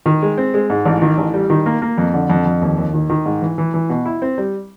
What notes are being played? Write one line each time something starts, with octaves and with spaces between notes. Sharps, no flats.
D#3
G#3
C4
G#3
G#2
A1
D#3
A1
G3
D#3
A#3
A#3
F2
D3
F2
F2
D#2
D#2
D#3
D#3
G#2
E3
E3
E3
B2
E4
C4
G3